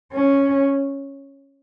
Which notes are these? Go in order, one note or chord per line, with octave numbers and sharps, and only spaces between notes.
C#4